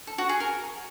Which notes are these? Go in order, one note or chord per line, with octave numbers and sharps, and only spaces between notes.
A4
F#4
G#4
A#4